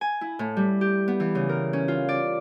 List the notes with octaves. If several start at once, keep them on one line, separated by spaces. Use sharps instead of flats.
G#5
E4
A2
G3
G4
B3
E3
C#3
A#4
C#4
F4
D5